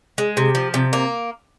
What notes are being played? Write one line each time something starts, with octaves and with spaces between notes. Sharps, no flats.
G#3
C3
F3
C3
A#3